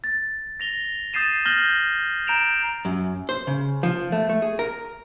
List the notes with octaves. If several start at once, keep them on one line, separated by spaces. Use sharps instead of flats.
A6
A#6 F7 G7
D#6 G6 A6 C7 D#7 E7
F6 G6 A6 A#6 F#7 G7
A#5 G6 D7 E7 F7
F#2
C5
C#3
F3
A3
A3
G#4
A#4